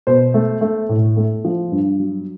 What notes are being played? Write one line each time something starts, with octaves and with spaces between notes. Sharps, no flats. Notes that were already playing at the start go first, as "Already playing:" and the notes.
B2 C5
A3
A3
A2
A3
F3
G2
F#3